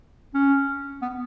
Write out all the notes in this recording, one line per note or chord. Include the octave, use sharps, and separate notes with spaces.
C#4
B3